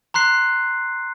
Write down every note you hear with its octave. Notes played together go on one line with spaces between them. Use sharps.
A#5 C6 F#6 C7